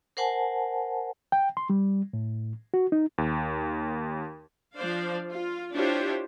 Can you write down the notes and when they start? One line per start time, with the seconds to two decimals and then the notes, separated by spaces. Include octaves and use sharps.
0.17 A#4 C5 F#5 G#5 A5
1.32 G5
1.57 C6
1.70 G3
2.13 A2
2.74 F#4
2.92 D#4
3.18 D#2
4.75 F3 D4 C5 D5 F5
5.29 F4
5.75 D4 E4 F4 G4 C5 C#5